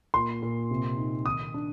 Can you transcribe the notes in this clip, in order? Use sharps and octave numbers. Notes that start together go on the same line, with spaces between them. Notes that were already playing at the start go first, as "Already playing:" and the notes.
A#2 C6
A#2
C3
D#4
D#3 D#6
D4